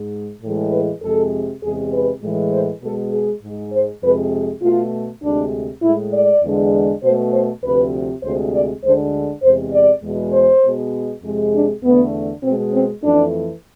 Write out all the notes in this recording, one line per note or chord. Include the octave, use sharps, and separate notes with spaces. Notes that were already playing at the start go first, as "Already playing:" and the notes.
Already playing: G#2 G#3
A2 E3 G#3
B4
F2 C3 G#3 A4
E2 C3 G#3 G#4
B4
A2 E3 G#3
C5
B2 G#3 A4
G#4
G#2 G#3
C5
F2 C3 G#3 B4
B2 A3 F4
D2 C3 G#3 D4
A2 G#3 E4
D5
E2 D3 G#3
B2 A3 C5
C5
D2 C3 F3 B4
D2 C3 G#3 C5
D5
D2 D3 G#3 C5
E2 C3 G#3 C5
D5
E2 B2 G#3
C5
B2 G#3
F2 C3 G#3
D4
E2 D3 A3 B3
B2 G#3 C4
C4
F2 E3 A3 D4